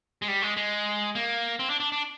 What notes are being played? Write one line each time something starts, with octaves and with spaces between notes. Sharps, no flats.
G#3
G3
G#3
G#3
A#3
C4
D4
D4
D4